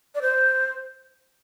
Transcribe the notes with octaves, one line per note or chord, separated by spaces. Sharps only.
D5
C5